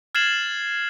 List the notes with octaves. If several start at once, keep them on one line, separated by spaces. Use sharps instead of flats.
F6 G#6 A6 C7 E7 F#7